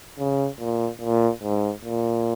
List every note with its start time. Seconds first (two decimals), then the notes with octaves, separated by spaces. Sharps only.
0.19 C#3
0.60 A#2
1.01 A#2
1.43 G#2
1.85 A#2